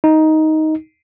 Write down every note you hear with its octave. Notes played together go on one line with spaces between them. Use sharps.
D#4